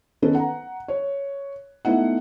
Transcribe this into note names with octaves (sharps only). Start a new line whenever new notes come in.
D#3 B3 C#4 A4 B4
F#5 A#5
C#5
A3 B3 D#4 E4 F#5